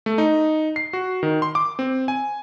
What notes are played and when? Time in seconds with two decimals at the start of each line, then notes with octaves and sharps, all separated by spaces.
0.06 A3
0.18 D#4
0.76 C7
0.93 F#4
1.23 D#3
1.42 C6
1.55 D6
1.79 C4
2.08 G#5